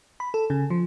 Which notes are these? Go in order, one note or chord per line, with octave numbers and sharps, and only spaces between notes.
B5
A4
C#3
F3